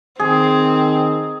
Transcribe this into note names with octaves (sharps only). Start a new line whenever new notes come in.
D#3 C4 G#4